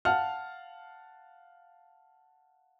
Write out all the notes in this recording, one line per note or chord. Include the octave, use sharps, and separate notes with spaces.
F5 F#5 A5 F6